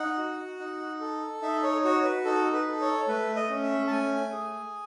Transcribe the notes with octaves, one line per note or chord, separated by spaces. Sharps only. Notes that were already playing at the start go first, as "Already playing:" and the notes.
Already playing: D#4 F#5
F#4
D#4
A4
D#4 E5
C#5
F#4 C#5
B4
D#4 A4
B4
A4
C#5
A3 B4
D#5
C#4
E5
A5
A3 G#5
G#4